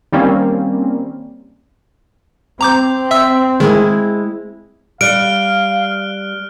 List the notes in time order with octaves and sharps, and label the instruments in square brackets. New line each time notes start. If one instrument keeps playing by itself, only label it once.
[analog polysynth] D#3 G3 A#3 C4 C#4
[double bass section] C4 [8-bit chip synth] A#5 D6 G6
[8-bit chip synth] E5 E6
[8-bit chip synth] D#3 [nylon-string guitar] G#3 E4
[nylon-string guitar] G3 [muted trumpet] F5 [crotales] F6 F#6 [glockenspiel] D7